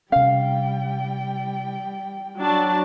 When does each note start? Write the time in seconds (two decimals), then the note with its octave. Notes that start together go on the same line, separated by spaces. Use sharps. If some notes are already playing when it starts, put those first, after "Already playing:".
0.12 C3 G3 C#4 F5 G5
2.38 F#3 D4 A5